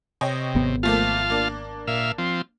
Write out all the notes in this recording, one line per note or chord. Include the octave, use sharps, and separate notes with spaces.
C3 C#5 D#5 G5
G#1 B3
F3 A3 A#3 F4 F5 A5
A#3 D4
A#2 E5 F5
F3 C4